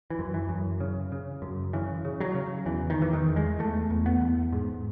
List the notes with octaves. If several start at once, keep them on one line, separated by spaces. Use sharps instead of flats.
E3
F#2
E3
F#2
C#3
C#3
F#2
C#3 E3
C#3
F#3
C#3
E2 E3
D#3
E2 E3
D#3
E2
G#3
E2 A3
E2
B3
E2
G#2